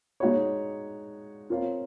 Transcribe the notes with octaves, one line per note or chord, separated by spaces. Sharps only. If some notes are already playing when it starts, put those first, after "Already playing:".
G#3 D#4 F#4 C#5
C4 F4 A#4 C#5 F5